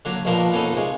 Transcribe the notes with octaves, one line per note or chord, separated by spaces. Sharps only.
D3 F#3 A#3
A#1 B2 F3 A#3 D4 A#4
A#3 B3 C#4 D#4 A4
C3 G#3